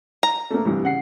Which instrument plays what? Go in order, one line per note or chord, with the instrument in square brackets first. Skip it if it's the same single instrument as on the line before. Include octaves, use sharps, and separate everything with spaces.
[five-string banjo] A#5
[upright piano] A3 A#3
C2 G2 E3
C#3 F#5 C7